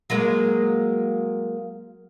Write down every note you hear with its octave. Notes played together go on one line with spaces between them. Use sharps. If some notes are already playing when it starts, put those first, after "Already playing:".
F#3 G#3 A#3